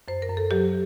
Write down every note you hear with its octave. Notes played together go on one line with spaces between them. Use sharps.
F#2 C5
A#4
F#2
A4
F#3 G4